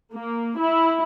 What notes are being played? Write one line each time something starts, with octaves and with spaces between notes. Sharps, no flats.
A#3
E4